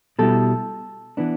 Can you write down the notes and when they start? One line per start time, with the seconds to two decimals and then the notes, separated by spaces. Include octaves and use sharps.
0.19 B2 G3 E4 A4
1.17 E3 B3 D4